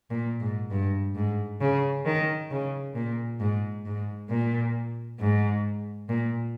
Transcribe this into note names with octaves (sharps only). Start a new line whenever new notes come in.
A#2
G#2
G2
G#2
C#3
D#3
C#3
A#2
G#2
G#2
A#2
G#2
A#2